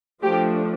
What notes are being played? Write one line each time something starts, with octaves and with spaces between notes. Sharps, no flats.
F3 A3 D4 G4